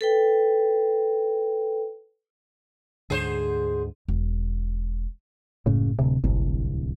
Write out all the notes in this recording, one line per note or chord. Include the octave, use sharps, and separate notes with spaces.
A4 B4 G5
D2 G#2 D3 G#4 B4 C5
E1
F#1 A2 C#3
D1 C3
D1 G1 C2